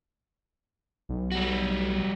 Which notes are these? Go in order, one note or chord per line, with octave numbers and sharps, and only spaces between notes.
B1
G3 F#4